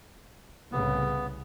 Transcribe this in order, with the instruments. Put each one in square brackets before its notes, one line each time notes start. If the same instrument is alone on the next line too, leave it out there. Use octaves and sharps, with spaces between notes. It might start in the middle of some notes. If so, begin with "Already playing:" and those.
[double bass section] C2 A2 C#3 [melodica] B3